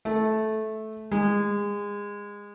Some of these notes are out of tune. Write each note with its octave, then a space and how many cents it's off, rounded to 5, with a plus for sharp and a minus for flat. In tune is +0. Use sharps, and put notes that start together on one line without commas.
A3 -15
G#3 -25